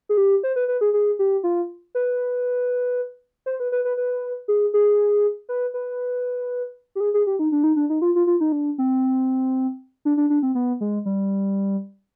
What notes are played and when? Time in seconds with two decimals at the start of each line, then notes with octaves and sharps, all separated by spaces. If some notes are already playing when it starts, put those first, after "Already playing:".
0.09 G#4
0.17 G4
0.43 C5
0.56 B4
0.68 B4
0.81 G#4
0.94 G#4
1.19 G4
1.44 F4
1.95 B4
3.46 C5
3.60 B4
3.72 B4
3.85 B4
3.97 B4
4.48 G#4
4.74 G#4
5.49 B4
5.74 B4
6.95 G4
7.00 G#4
7.14 G#4
7.27 G4
7.39 D#4
7.52 D4
7.64 D#4
7.76 D4
7.90 D#4
8.02 F4
8.15 F4
8.27 F4
8.41 D#4
8.52 D4
8.78 C4
10.05 D4
10.17 D4
10.30 D4
10.43 C4
10.55 B3
10.81 G#3
11.06 G3